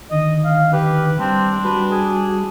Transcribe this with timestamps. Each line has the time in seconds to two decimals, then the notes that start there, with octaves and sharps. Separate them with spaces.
0.11 D3 D#3 D#5
0.44 F5
0.73 G4 B4
1.19 G3 C4 D4
1.65 G3 F#4 B4
1.91 G#4